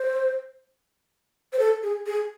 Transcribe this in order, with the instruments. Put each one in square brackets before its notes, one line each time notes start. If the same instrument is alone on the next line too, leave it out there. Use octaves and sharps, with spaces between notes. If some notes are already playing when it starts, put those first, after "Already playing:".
Already playing: [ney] C5
C5
A4
G#4
G#4